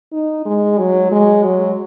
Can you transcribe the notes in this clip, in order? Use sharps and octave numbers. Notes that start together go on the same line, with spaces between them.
D#4
G#3
F#3
G#3
F#3